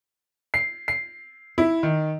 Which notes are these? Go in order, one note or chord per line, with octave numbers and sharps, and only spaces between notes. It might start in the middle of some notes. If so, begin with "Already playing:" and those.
C7
C7
E4
D#3